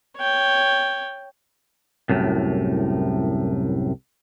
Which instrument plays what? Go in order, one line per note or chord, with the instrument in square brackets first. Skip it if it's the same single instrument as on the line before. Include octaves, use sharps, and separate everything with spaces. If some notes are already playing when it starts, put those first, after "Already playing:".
[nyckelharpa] C#5 G5
[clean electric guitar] C2 F#2 A2